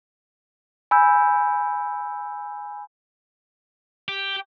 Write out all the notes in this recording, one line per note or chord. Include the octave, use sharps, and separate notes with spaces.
G#5 B5 E6 G6
G4